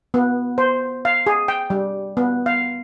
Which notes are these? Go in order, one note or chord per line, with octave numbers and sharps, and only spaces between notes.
B3
C5
F5
G#4
G5
G3
B3
F5